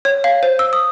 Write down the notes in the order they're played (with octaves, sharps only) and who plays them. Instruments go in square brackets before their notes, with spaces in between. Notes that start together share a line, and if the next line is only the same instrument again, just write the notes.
[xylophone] C#5
F5
C5
E6
D#6